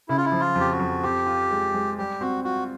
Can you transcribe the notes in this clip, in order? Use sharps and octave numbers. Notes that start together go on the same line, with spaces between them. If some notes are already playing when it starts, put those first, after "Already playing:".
C#3 E4
F4
E4
F3
F4
F2 G4
F#4
F2
C4 G4
F4
G#3
G#3
G3 G4
C4 F#4
F4 F#4